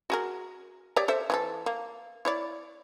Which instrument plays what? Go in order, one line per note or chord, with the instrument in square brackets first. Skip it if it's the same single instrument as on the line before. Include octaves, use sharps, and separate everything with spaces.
[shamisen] F#4 G#4 A#4
G4 C#5 D5
A4 C5 E5
E3 G4 A4
A#3
E4 C#5 D5